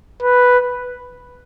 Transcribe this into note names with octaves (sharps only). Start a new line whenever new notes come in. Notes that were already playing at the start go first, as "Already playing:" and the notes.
B4